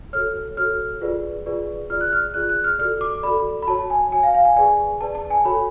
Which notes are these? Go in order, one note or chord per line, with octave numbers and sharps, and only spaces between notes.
F#4 A4 C#5 F6
F#4 A4 C#5 F6
F4 G#4 B4 D5
F4 G#4 B4 D5
F4 G#4 D5 F6
F#6
F6
F4 G#4 D5 F#6
F#6
F6
F#4 A4 D5 F6
D6
F#4 A4 D5 B5
B5
F#4 C#5 A5
G#5
F#4 C#5 G#5
F5
F5
G#5
G#4 B4 D5 G#5
G#4 B4 D5 A5
A5
G#5
F#4 A4 C#5 B5